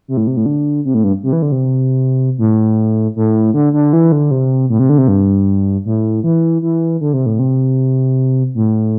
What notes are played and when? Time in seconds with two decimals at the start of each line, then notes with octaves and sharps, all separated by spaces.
0.08 C3
0.17 A2
0.27 C3
0.37 A2
0.46 D3
0.85 C3
0.94 A2
1.04 G2
1.23 C3
1.33 E3
1.42 D3
1.52 C3
2.38 A2
3.16 A2
3.54 D3
3.73 D3
3.93 E3
4.12 D3
4.31 C3
4.70 A2
4.79 C3
4.89 D3
4.98 C3
5.08 G2
5.85 A2
6.24 E3
6.62 E3
7.01 D3
7.13 C3
7.26 A2
7.39 C3
8.55 A2